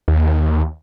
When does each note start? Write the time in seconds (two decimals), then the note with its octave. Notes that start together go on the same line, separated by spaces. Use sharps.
0.08 D#2